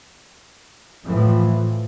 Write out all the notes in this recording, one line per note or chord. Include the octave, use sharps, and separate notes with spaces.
A2 E3 F3